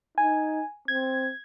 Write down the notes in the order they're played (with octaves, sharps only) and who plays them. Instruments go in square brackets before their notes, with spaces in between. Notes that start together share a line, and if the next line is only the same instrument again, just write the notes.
[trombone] D#4 [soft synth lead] G#5
[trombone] C4 [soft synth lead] G#6